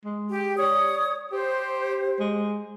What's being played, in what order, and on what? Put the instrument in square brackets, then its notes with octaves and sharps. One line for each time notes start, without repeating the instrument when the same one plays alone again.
[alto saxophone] G#3
[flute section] G4
[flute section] C#5 D#6 [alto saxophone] D5
[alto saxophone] G4 [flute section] C5
[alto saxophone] G#3